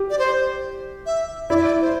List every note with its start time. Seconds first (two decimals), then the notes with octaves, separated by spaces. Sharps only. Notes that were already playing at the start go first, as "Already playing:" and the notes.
Already playing: G4
0.10 D5
0.19 C5
1.06 E5
1.50 E4 D5
1.57 E5
1.64 D5
1.82 C5